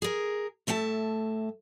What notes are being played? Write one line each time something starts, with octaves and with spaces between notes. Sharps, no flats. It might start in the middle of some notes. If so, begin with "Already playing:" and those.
G#4 A#4
A2 A3 E5 F#5 A5